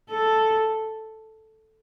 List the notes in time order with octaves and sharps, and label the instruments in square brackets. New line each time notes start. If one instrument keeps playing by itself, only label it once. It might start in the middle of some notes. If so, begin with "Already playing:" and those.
[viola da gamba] A4